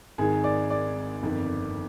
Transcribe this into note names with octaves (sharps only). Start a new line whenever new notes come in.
G#1 G#2 D#3 G#4
D5
D5
G1 F2 D#3